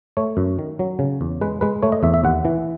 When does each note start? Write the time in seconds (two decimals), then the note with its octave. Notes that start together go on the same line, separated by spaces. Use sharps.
0.17 A3 C#5
0.37 F#2
0.59 D#3
0.79 F#3
0.99 C#3
1.21 E2
1.41 G#3 B4
1.61 G#3 B4
1.83 A3 C#5
1.92 D#5
2.03 E2 E5
2.14 E5
2.24 D#2 F#5
2.45 E3